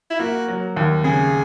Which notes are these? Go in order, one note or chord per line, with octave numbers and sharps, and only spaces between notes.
E4
A#3 F#4
F#3
D#2
C#3 G#4